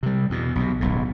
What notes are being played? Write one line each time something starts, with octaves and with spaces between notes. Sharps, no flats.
C3 G3
E2 B2
B1 C3
D1 B1 A2